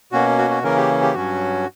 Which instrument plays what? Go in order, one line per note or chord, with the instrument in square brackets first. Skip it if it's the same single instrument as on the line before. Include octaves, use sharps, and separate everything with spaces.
[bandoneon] B2 A#3 C#4 F#4
F#4
F#4
C#3 E3 A#3 C#4 A#4
G4
G4
G2 F#3 C#4 F#4